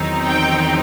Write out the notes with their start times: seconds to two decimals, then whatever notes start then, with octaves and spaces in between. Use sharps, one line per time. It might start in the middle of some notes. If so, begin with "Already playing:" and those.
Already playing: E2 D#3 F#3 C4 D#4
0.26 G5